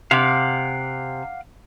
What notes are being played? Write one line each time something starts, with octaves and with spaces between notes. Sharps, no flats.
C3 F5 F#5 D6